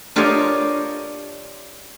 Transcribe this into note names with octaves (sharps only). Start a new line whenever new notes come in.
D4 F4 G4 A#4 C#5 D#5